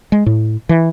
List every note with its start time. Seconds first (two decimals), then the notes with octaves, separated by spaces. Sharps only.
0.12 G#3
0.26 A2
0.69 E3